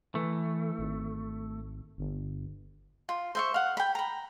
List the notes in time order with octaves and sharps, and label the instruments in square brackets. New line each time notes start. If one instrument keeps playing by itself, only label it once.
[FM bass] E3 [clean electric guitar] A3
[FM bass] G#1
G1
[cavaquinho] F4
C5 E5 C#6
F5 F#5
G5 B5
A#5 B5